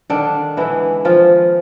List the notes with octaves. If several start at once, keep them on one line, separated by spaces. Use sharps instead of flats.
D3 D#3 D4
E3 G#3 B3 E4
D#3 F3 F4